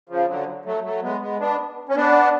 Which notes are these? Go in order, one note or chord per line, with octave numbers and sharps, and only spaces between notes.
C#3 F3
D3 F#3
F#3 A3
F#3 A3
G#3 B3
G#3 B3
B3 D4
C#4
B3 D4